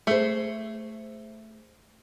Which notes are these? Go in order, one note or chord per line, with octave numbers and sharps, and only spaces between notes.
A3 G#4 C5